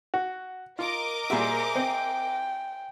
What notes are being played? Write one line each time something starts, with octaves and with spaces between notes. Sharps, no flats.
F#4
F4 A#4 D#5 D6
A#2 G3 F#4 G#4 C5 E5
C4 G5